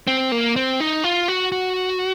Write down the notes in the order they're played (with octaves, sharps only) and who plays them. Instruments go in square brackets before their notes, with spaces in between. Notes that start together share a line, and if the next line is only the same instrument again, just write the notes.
[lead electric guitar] C4
A#3
C4
D#4
F4
F#4
F#4